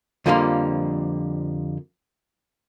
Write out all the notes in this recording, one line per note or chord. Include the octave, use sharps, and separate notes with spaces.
F2 D3 F3 G3 G#3 A#3